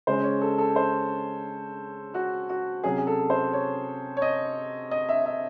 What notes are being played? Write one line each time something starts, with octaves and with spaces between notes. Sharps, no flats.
C#3 G#3 C#4 C5
C#5
A4
A4
C5
F#4
F#4
C3 F#3 C#4 G#4
G#4
A4
C5
C#5
C#5
D#5
D#5
E5
E5